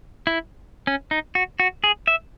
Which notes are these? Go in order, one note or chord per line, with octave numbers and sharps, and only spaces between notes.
E4
C#4
D#4
F#4
F#4
G#4
E5